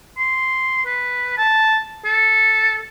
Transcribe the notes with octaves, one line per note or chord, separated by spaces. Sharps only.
C6
B4
A5
A4